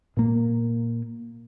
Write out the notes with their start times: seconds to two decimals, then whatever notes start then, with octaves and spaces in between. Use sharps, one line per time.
0.17 A#2 A#3